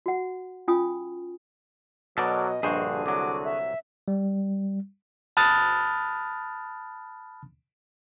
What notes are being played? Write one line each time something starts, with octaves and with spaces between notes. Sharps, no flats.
F#4 F#5
C#4 F4 G#5 D#6
B2 F#3 A4 A#4 D5 D#5
A#1 G2 D3 F#4 G#4 C5
C2 F#3 D6
E5
G3
A5 B5 D#6 F6 F#6 A6